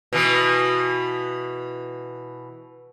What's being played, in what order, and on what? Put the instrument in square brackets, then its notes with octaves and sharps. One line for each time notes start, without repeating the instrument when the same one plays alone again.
[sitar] B2 E3